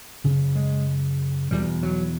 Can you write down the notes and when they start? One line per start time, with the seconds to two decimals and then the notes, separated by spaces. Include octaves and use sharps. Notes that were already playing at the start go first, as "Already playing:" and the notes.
0.24 F#2 C#3
0.55 G#3
1.51 E2 B2 G3
1.83 F#3